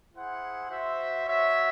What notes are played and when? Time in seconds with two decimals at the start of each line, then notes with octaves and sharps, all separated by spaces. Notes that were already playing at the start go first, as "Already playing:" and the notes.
0.15 E4 G#4 C5 F#5
0.70 F#4 C5 E5
1.27 F#4 C#5 E5